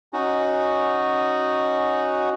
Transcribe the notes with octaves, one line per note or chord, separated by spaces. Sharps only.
C#4 D#4 F#4